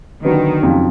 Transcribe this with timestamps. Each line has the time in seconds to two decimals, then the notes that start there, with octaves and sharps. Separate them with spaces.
0.24 D3 D#3 F#3 B3
0.62 F2 C#3 F#3